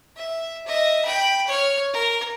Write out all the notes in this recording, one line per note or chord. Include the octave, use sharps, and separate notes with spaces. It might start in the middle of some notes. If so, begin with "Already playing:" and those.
E5
D#5 E5
G5 B5
C#5 F6
A#4